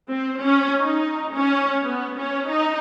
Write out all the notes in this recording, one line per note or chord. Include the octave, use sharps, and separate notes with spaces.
C4
C#4
D#4
C#4
B3
C#4
D#4